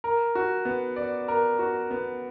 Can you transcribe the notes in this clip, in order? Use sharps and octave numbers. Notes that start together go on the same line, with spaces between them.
A#4
F#4
B3
D5
A#4
F#4
B3